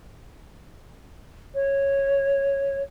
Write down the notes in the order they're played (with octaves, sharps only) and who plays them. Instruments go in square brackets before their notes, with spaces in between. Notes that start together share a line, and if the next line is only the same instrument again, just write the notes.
[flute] C#5